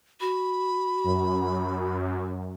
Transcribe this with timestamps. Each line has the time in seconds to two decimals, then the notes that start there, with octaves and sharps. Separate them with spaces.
0.21 F#4 B5
1.04 F#2